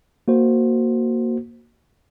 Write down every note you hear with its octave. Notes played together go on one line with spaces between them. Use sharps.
A#3 F#4 C5